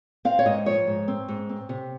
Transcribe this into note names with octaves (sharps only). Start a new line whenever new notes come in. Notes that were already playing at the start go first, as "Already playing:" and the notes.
C4 F5
C#5
G#2 D#5
F3 C#5
G#2
C4
G#2
C4
C3